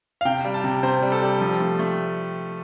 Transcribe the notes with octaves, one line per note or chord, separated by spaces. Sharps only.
F5
C3 G5
G3
A5
C3
C3 C5
G3
A4
G3
F3
A3
A3